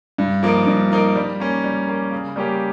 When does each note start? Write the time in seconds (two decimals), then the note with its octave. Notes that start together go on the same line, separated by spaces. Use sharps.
0.18 G2
0.43 F3 A#3 D#4 A#4
0.67 G2
0.91 F3 A#3 D#4 A#4
1.16 G3
1.40 A#3 C#4
1.64 G3
1.88 A#3 C#4
2.12 C#3
2.36 G3 A#3 C#4 G4